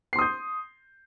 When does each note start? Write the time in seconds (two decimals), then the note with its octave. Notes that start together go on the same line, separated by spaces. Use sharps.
0.13 C7
0.16 C6
0.19 D#6
0.21 G6